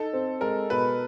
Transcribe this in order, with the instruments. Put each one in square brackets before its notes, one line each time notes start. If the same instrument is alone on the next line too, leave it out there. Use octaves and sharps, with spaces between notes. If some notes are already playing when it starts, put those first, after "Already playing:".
Already playing: [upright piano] D#4 [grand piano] A4
[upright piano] C4
[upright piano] G#3 [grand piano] A#4
[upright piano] B2 [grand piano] B4